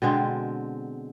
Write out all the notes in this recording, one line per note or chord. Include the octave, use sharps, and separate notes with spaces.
B2 D3 G#3 C4